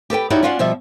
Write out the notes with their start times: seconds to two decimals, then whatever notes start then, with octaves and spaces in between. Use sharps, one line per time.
0.10 G4 A4 B4 G5
0.30 D#4 E4 F#4 G4 C#5 D5
0.43 C#4 D4 F4 F#4 F5 F#5
0.59 B2 F3 G3 E5